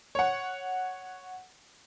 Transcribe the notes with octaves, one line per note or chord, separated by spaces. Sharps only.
C#5 F#5